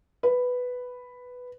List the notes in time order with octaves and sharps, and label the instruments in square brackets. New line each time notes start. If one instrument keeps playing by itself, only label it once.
[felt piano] B4